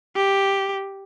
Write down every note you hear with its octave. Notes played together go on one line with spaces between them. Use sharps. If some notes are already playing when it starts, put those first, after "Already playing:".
G4